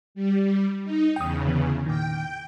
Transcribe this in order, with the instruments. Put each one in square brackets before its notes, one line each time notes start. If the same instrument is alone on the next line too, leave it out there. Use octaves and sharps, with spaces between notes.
[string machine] G3
D#4
[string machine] E2 C#3 [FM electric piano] G5 D#6
[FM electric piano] D3 E3 B3
[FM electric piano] A#2 D#3 [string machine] G5